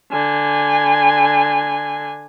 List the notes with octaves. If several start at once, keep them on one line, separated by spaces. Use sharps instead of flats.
D3 G#5